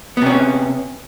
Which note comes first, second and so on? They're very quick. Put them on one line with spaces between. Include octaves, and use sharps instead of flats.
B3 C3 C#4